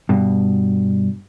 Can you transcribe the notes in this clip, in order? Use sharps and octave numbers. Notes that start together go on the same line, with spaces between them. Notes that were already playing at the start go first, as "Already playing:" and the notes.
G2 B2